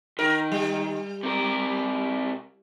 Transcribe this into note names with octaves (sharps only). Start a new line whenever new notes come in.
D#3 A#4
G3
C3 A#4